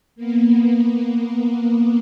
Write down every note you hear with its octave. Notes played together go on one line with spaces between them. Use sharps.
A#3 B3